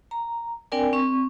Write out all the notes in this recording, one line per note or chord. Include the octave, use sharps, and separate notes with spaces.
A#5
C4 D4 A#4 D5 G5 G#5
C4 C#6